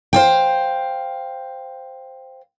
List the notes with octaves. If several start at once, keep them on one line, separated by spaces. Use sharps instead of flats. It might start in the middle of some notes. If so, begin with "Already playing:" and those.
C5 F5 G5